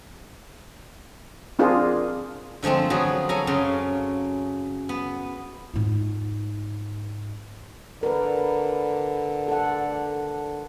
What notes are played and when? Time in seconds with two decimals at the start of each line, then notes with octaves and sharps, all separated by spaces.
1.59 C4 D4 F4 G#4 A#4
2.63 D3 F3 G#3 A3 C4
2.90 F3 F#3 B3 F#4 G#4
3.29 F#3 A4 G#5 A#5
3.47 F#2 C#3 F5 C6
4.89 B3
5.74 G#2 F4
8.03 D3 A#4 B4
9.48 A4 F#5